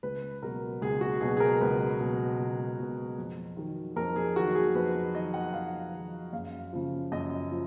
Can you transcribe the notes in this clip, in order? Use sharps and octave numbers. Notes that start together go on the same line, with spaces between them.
C#2 B4
B2 F#3 A#4
C#2 G#4
F#4
B2 F#3 G#4
G#4
A#4
C#2 B4
B2 F#3
C#2
B2 F#3
F2
D#3 F#3
F2 A#4
G#4
D#3 F#3 F#4
G#4
F2 B4
D#3 F#3 D#5
F#5
F2 F5
D#3 F#3
F#2 F5
C#3 F3
F#2 D#5
F3